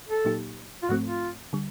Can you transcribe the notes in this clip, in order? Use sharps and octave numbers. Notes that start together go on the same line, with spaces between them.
A4
A#2 F#3 A#3 D#4 G4
F4
G#2 F3 A3 C4 F#4
F4
D3 G3